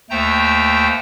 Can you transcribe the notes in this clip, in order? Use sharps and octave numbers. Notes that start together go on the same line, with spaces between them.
D#2 A3 C5 G5 A#5